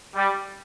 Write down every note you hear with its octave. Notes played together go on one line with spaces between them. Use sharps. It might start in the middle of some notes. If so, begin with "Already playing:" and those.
G3